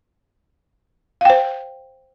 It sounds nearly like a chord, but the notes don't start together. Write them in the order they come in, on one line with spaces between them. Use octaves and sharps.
F5 G5 C5